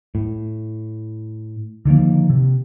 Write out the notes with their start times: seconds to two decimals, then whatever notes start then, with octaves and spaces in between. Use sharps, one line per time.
0.15 A2
1.85 D3 D#3 F3 A#3
2.30 C3